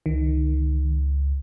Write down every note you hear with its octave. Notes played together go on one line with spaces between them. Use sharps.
C#2 D#3